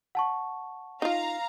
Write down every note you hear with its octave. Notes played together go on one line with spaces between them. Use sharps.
F#5 A5 C#6
D#4 F4 F5 A#5